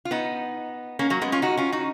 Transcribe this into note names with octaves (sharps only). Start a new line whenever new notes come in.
F4
B3 D#4
A#3 C#4
F#3 A#3
G#3 B3
C#4 F4
D#4 F#4
C#4 F4
D#4 F#4